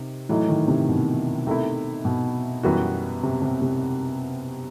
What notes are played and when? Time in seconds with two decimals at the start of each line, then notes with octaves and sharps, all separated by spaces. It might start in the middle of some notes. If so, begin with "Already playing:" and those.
Already playing: C3 D#3
0.29 A2 E3 F#3 A3 D#4
0.48 D#3
0.68 C3
0.88 B2
1.47 C3 D#3 A3 E4
2.05 B2
2.63 F#2 E3 G3 B3 F#4
3.23 C3
3.42 C3
3.62 C3